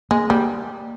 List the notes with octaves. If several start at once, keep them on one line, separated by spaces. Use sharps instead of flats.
G#3 A#3
G3 A#3